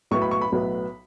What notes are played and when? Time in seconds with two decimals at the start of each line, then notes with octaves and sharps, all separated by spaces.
0.11 B1 A2 F#3 B3 C#6
0.22 B5
0.31 C#6
0.41 B5
0.52 B1 A2 F#3 B3